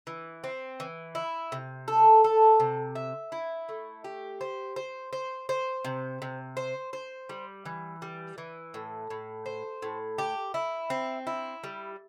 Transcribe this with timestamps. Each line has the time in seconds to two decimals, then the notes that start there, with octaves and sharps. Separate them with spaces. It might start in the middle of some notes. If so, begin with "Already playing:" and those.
0.07 E3
0.44 C4
0.80 E3
1.15 E4
1.52 C3
1.88 A4
2.24 A4
2.60 C3
2.95 E5
3.32 E4
3.69 A3
4.04 G4
4.41 C5
4.76 C5
5.13 C5
5.49 C5
5.84 C3
6.22 C3
6.57 C5
6.93 C5
7.29 G3
7.65 E3
8.02 G3
8.38 E3
8.74 A2
9.10 A2
9.46 C5
9.82 A2
10.18 G4
10.54 E4
10.90 C4
11.27 E4
11.64 G3